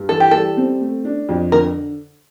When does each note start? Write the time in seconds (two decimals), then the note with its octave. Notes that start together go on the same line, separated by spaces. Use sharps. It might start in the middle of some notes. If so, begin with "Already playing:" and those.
Already playing: G2
0.09 E3 A4
0.20 G4
0.31 G3 A4
0.57 C4
0.81 A3
1.05 D4
1.29 F2
1.52 D3 A#4